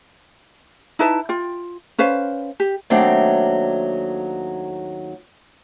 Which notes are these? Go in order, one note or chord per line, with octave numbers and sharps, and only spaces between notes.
D#4 E4 B4 A5
F4 G5
C#4 B4 C5 F5
G4
D#2 F#3 A3 C4 D4